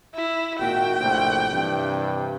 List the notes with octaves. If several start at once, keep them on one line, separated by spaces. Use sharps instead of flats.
E4
G#1 A#2 F#4 G5
A#1 A2 C3
G2 C3 E3